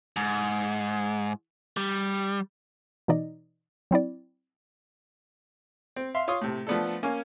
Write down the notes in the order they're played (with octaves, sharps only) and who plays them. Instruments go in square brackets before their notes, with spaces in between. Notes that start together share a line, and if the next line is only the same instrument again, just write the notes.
[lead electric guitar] G#2
G3
[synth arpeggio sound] B2 E3 D#4 D5 D#5
F#3 C4 E4 D5
[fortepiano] C4
E5 F5 C6
F4 C#5 C6 D#6
A2 C3
F3 A3 B3 D4 A4
A#3 C#4 G#5